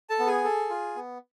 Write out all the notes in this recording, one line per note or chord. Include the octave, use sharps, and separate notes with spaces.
A4 A5
B3
G#4 G#5
A4
F4
B3